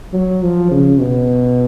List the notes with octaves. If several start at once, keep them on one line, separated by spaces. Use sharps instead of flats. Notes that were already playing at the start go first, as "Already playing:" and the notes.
F#3
F3
C#3
B2